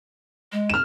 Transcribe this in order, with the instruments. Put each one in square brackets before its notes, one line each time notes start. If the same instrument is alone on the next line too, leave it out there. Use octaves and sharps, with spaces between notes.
[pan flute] G#3
[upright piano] F6 E7